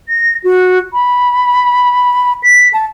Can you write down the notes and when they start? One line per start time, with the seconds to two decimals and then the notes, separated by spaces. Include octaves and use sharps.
0.09 A#6
0.44 F#4
0.94 B5
2.43 B6
2.73 A5